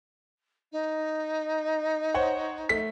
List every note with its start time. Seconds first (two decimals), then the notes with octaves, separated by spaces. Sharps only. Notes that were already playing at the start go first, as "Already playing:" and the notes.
0.72 D#4
2.14 C5 C#5 F#5
2.69 A3 B6